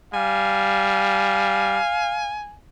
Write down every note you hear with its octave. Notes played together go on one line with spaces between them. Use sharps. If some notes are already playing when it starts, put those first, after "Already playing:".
G3 F5 G#5